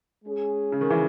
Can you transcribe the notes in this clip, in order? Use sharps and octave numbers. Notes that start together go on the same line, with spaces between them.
G#3 C#4 G#4
C#3
D#3
C#3 E3